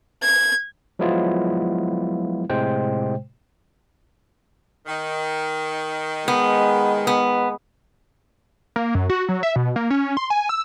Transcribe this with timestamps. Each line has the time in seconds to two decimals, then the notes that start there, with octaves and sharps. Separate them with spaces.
0.22 G#6
0.99 F3 F#3 G#3 B3 E4 F4
2.50 A2 C3 G#3 C5 G5
4.87 D#3
6.28 G#3 B3
7.07 B3
8.76 A#3
8.95 F#2
9.10 F#4
9.29 F#3
9.43 E5
9.56 B2
9.76 A#3
9.90 C#4
10.17 C6
10.30 G#5
10.49 E6